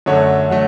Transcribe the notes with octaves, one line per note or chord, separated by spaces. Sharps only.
F#2 D3 F#3 A3 C#5
D3 F#3 A3